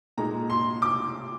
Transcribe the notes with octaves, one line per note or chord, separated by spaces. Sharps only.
A#2 G#3 D#4 A#5
C6
D6